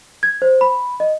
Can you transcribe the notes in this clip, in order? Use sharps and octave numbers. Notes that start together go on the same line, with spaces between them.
G#6
C5
B5
D#5